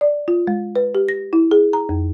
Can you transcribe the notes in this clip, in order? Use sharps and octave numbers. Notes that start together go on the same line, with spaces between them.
D5
F4
G#3
B4
G4
A#6
E4
G#4
A#5
F2